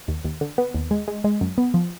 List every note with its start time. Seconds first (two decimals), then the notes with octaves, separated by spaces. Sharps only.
0.08 D#2
0.25 D#2
0.41 D3
0.58 B3
0.74 D#2
0.91 G#3
1.08 G#3
1.24 G#3
1.41 F#2
1.58 B3
1.74 F3